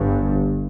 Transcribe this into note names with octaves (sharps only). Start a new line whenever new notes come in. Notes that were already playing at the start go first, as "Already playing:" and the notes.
Already playing: G1 G2